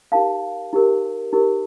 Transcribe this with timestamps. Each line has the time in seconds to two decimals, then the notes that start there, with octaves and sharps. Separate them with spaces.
0.12 D#4 G4 A#4 F5 A5
0.73 D#4 G4 A#4
1.33 D#4 G4 A#4